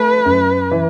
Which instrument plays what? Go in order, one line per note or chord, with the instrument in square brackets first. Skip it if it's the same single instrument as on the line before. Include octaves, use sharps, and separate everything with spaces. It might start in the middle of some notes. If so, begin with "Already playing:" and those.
Already playing: [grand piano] A3 [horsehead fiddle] B4
[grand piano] F#2
E3